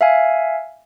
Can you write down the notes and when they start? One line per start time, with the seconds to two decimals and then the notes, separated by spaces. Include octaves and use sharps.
0.01 E5 F5 G#5